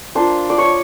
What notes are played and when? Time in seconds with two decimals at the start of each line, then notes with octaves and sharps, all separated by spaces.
0.15 A#3 D4 F4 C5
0.50 D5
0.58 C#5